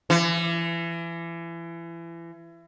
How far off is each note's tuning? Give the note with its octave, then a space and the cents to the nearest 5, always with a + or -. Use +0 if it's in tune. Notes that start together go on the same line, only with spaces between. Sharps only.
E3 +30